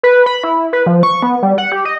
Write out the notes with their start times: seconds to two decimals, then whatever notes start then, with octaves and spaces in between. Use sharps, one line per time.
0.03 B4
0.26 B5
0.44 E4
0.73 B4
0.86 F3
1.03 C#6
1.22 B3
1.43 G3
1.58 F#5
1.72 G4
1.85 D#5